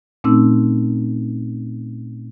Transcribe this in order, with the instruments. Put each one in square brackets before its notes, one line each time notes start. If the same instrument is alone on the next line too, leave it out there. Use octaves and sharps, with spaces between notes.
[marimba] A#2 A3 C4 C#4 D#4 E6